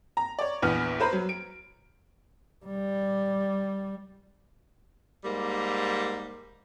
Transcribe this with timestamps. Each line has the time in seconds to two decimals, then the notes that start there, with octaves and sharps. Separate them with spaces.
0.17 A#5
0.39 C#5 D5
0.62 A#1 E2 B3 F6
1.00 B4 C5 A#5 B5
1.13 F#3
1.29 D7
2.66 G3
5.24 G#2 G3 A#3